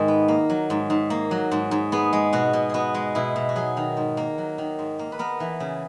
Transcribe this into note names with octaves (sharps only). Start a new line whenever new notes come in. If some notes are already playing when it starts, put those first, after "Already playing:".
Already playing: G#2 D#3 G#3
B3
A#3
F#3
G#2
G#2
A#3
F#3
G#2
G#2
B3 G#4
G#3
B2 F#4
B2
B3 F#4 G#4
G#3
B2 E4
B2
F#4
F#3 G#4
D#3
G#2
A#3
F#3
D#3
G#2
A#3
B4
B3 A#4
E3
C#3